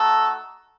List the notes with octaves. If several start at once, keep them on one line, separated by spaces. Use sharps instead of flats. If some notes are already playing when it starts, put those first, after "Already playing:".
Already playing: A3 D#4 F#4 A4